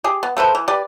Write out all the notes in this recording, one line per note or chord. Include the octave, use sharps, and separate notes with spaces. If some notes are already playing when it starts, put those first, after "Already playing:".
G4 G#4
B3
A3 A4 B4 C5
E3
G4 B4 D5